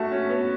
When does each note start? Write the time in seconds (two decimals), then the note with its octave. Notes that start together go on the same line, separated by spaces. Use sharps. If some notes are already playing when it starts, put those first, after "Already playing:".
Already playing: A3 F#4 A5
0.11 C#4
0.30 B3